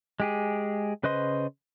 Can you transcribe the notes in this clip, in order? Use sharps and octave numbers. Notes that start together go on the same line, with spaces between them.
G#3 G4 G#4
C#3 B4 C5 D#5 C6